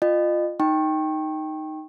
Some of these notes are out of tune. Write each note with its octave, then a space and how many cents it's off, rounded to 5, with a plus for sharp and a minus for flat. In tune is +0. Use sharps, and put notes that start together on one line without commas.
F4 +0 D#5 -35 G5 +30
D#4 +0 G5 +0 C#6 -35